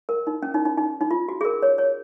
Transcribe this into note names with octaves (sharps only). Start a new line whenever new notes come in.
A#4
D#4
C#4
D#4
D#4
D#4
D#4
F4
F#4
G#4
A#4
C#5
C#5